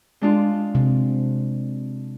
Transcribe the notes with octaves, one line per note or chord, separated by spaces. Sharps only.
G#3 D4 F4
C3